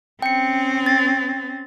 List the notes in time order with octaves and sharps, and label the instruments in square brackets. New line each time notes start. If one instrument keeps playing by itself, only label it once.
[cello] C4 C#4 [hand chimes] G5 C#7
[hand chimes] A6